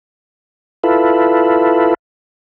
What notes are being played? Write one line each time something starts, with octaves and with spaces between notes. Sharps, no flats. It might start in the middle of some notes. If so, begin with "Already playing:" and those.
E4 F4 A4 B4